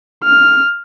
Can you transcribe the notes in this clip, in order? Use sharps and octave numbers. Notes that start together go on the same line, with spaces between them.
F6